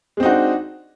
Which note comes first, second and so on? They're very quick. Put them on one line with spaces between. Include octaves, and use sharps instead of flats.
G#3 C4 D#4 F#4 D4